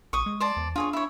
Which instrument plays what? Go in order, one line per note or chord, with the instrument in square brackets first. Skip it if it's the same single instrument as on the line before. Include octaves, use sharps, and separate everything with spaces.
[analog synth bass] A#1 [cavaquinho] C#6 D#6
[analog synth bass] G#3
[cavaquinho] C5 D5 A5
[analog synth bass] E2
[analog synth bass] D4 [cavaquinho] F4 G#4 C#5
[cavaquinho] E4 C#5